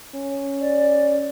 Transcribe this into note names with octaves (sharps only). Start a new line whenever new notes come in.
C#4
D5